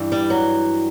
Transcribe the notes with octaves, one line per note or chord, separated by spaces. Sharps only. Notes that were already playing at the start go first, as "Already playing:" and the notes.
Already playing: G2 E3
G3
F#3